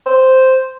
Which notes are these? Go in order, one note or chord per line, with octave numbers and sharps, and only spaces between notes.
C5